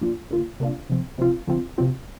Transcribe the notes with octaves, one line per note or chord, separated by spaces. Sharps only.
A#2 F3 D4 F4
D3 A#3 F4
C3 A#3 D4 F4
C3 F3 C4
C3 F3 C4 F4
D3 F3 C4 F4
C3 F3 C4 F4